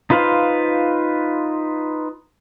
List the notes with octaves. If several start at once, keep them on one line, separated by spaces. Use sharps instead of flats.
D#4 F4 B4 C5 F5